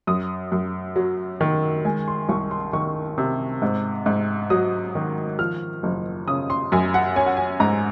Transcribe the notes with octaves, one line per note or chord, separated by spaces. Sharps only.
F#2 D#6
F#2
F#3
D#3
G#3 G#5
C6
C2 C#6
C6
D#3 C#6
C3
G#2
G#2
F#3 D#6
D#3
F3 F6
F#1
C#3 D#6
C6
F#2 G#5
F#5
C#4 G#5
F#5
G#5
G#2 A#5